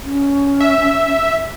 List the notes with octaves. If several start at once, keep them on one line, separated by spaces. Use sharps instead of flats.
C#4
E5